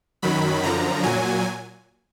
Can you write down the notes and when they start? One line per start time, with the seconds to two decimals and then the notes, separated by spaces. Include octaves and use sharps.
0.22 F#2 D#3 F#3 B5
0.63 F#2 D3 F3 A#5
1.03 A#2 F#3 G#5